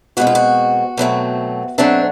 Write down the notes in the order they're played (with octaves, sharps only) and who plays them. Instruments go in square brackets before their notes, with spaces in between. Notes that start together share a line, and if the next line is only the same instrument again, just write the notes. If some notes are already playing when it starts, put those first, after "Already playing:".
[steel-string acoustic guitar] B2 G#3 C4 F#4
F4
F#4
B2 F#3 A3 C4
B2 F#3 A3 C4 D4